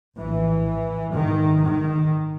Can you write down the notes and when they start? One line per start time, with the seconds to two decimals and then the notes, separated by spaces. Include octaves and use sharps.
0.19 A#1 A2 E3
1.15 G#1 G#2 D#3
1.64 D#3